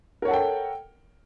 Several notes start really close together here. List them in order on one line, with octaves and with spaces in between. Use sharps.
A#4 C#5 F#5 A4 G5